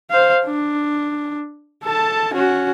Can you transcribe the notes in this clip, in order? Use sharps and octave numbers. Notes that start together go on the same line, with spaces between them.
C5 F5
D4
A4 A5
C#4 F#4